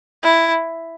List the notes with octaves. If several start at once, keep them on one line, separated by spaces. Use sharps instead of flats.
E4